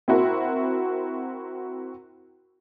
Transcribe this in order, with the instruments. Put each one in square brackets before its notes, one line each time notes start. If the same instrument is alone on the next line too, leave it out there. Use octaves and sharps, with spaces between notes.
[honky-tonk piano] C4 E4 F#4 A#4